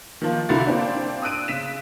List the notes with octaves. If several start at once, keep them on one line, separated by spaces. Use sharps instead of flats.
D#3 F3 A#3
C2 D3 A#3 E4 F#4 A6
A#3 C4 D4
D#6 E6 F#6 D7 D#7
C#3 B6 E7